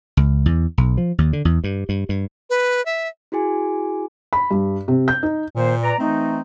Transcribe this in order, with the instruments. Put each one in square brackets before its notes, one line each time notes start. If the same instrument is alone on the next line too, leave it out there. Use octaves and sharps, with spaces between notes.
[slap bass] C#2
E2
B1
F3
D#2
D3
E2
G2
G2
G2
[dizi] B4
E5
[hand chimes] E4 F#4 G#4 G#5
[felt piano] B5
G2
C3
G6
D#4
[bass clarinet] A#2 [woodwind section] D#3 A#3 C5
[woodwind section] B4 D5 A#5
[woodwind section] E3 A3 D#4 [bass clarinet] C4